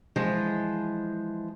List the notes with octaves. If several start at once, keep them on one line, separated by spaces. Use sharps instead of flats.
E3 F3 G#3